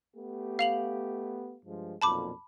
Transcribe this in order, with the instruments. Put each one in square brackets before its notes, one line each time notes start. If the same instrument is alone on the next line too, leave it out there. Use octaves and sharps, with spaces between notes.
[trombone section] A3 B3 G4
[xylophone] F5 F7 F#7
[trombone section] G2 F3 G#3
[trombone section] B1 F2 A#2 [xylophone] A5 B5 D6